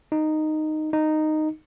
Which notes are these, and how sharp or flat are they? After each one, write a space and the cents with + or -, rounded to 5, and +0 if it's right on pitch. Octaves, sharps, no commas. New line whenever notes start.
D#4 -10
D#4 -10